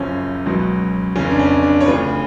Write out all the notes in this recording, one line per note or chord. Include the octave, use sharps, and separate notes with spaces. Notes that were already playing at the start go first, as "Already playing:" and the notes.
Already playing: F#1 F#2 C#3 F3 C#4
C#2 B2 F#3
F1 F2 C#3 C#4
D4
C#4
D4
C#5
D2 C#3 F3 B4